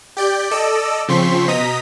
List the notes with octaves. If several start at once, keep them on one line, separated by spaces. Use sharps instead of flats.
G4 D5 G6
A4 D5 D#5 E6
C#3 F3 C4 C6 C#6 B6
B2 D#5 A#5 D#6 B6